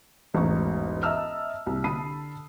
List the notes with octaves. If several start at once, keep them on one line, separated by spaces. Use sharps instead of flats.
E1 A1 G#2 A#5 C#6
D#5 E5 A5 A#5 E6 F6
C2
D3 A5 B5 D#6 C7 D#7